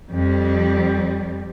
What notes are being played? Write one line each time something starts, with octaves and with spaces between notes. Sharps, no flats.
F2 G3